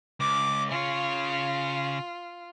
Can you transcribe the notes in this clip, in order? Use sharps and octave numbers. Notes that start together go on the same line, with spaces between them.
C#2 D6
C#3 F4 C#5